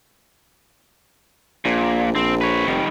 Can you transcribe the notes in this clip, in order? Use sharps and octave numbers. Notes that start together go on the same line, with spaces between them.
A#1 A#2
A#1 C4
B4 C#5
F1 D#3 G3